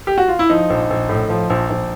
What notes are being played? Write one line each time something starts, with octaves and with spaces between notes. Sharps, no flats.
G4
F#4
F4
E4
F3 D#4
A#1
A#1
A2
F3
A#1
A#1